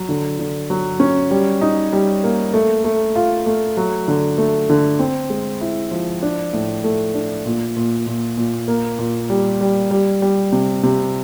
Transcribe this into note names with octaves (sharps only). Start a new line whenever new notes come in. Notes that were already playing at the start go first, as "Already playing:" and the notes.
Already playing: F#3
D3
D3
F#3
C#4
G3
D#4
G3
A#3
A3
A3
F4
A3
F#3
D3
A3
D3
C4
G#3
E4
F3
D4
A2
A3
D4
A#2
A#2
A#2
A#2
A#3
A#2
G3
G3
G3
G3
C3
C3